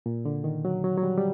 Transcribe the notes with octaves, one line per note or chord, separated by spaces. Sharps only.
A#2
D3
D#3
F#3
F#3
F#3
G3
G3